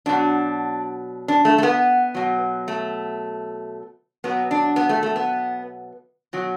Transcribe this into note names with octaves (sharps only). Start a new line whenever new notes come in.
B2 F#3 D4
D4
A3
A3
B3
B2 F#3
A3
B2 F#3 B3
D4
B3
A3
A3
B3
B2 F#3